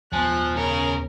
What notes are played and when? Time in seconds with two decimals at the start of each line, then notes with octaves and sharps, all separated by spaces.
0.13 D#2 F3 G#3 B3 G#5 F#6
0.57 C#3 A#4 C#5